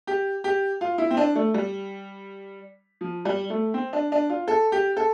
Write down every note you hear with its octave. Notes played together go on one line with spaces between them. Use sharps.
G4
G4
F4
E4
C4
D4
A3
G3
F3
G3
A3
C4
D4
D4
F4
A4
G4
A4